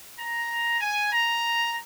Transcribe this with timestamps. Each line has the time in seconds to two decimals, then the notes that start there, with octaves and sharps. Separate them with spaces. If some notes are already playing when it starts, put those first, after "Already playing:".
0.19 A#5
0.81 G#5
1.12 A#5